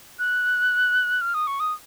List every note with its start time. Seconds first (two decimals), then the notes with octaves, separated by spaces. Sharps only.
0.19 F#6
1.21 F6
1.34 D#6
1.47 C#6
1.60 D#6